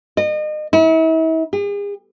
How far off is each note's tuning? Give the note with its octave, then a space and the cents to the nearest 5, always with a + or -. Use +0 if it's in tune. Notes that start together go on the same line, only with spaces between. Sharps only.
D#5 -35
E4 -40
G#4 -40